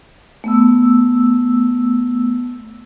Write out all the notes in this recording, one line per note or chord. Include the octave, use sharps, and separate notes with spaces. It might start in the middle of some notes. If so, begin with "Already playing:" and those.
A3 B3 E6